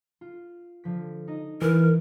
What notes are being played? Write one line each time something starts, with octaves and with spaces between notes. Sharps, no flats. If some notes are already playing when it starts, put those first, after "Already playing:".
F4
D3 F3 B6
D#4 D#5
E3 A#4